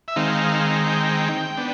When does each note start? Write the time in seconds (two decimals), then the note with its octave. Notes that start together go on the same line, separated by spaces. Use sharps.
0.08 E5
0.16 D#3 G#3 C4 D#4 F5
0.86 G5
1.57 B3 D4